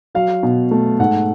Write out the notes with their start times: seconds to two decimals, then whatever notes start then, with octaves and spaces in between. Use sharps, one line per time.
0.15 F#3 F5
0.43 B2
0.71 A3
0.99 G#2 F#5